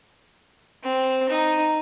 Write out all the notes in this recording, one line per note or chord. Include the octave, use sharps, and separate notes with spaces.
C4
D#4